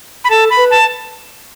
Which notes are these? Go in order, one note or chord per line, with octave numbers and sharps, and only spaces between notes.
B5
A4 A5
B5
B4
A5